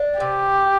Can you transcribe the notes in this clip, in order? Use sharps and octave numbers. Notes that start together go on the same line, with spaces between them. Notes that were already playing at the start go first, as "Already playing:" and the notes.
Already playing: D4
C3 G4